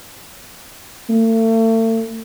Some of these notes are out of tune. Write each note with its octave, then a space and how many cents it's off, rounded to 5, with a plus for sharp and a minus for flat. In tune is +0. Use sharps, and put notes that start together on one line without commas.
A3 +40